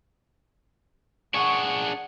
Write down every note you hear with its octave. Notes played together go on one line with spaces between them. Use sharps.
D4 G#4 F#5 C#6